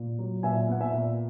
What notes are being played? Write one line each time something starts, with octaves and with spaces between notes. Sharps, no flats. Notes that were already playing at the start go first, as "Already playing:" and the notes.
Already playing: A#2
F#3
A#2 E5 G#5
B3 F#5
E5 G#5
A#2